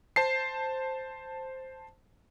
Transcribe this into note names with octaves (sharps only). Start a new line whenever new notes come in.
C5 A5 C7